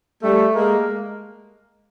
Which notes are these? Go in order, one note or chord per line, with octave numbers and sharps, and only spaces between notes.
G3 A3
G#3 A#3